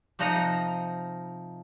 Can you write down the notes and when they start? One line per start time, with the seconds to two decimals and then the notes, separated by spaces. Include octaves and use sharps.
0.19 C3 F3 D#4 D#5 F#5 A#5